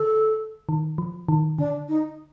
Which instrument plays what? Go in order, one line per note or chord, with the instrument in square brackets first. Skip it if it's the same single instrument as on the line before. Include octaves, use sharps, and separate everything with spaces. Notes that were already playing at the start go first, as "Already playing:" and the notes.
Already playing: [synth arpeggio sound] D3 [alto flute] A4
[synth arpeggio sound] D#3
F3
D#3
[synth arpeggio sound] D3 [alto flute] D4
[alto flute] D#4